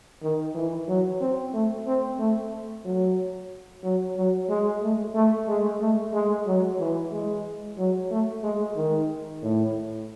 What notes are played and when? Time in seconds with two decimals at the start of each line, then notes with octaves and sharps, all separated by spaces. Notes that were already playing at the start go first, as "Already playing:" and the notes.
0.22 D#3
0.55 E3
0.88 F#3
1.21 C4
1.54 A3
1.86 C4
2.19 A3
2.85 F#3
3.83 F#3
4.17 F#3
4.49 G#3
4.82 A3
5.15 A3
5.48 G#3
5.81 A3
6.13 G#3
6.47 F#3
6.79 E3
7.12 G#3
7.78 F#3
8.11 A3
8.43 G#3
8.76 D#3
9.42 A2